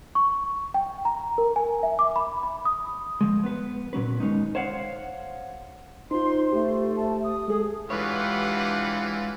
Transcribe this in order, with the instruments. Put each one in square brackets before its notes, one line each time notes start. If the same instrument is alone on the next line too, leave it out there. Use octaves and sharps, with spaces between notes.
[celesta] C#6
G5
A#5
A#4
G#5
E5
D6
B5
B5
D#6
[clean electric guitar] F3 G#3
B3 B4
A#2 F#3 C#4 B4
D#2 G#3 C#4 D#4
C5 C#5 F5 F#5
[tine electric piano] D#4 F4 [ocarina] C5 [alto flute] C6
[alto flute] A3 [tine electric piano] G4
[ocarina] A5
D#6
[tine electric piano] G#3 A4 [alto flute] G#4
[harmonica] E3 F4 [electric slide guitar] G#3 C#5 [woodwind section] D4 B4 [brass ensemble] G4 F#5